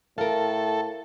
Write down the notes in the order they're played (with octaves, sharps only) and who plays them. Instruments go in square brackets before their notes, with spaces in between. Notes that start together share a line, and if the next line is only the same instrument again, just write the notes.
[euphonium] A2 [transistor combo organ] A4 [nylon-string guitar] A#4 F5